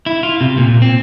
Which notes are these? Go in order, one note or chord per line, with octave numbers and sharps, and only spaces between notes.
E4
F4
C3
A#2
C4